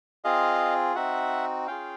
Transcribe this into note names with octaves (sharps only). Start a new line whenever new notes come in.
C4 F4 G#4 D#5 F5
C4 D#4 F#4 E5 F#5
C#4 F4 G#4 F5 G5